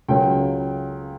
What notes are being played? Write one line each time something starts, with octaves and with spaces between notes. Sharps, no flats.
C#2 C#3 F#3 G5